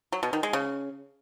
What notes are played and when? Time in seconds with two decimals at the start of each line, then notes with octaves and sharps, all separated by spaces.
0.12 F#3
0.23 B2
0.33 D#3
0.43 G#3
0.53 C#3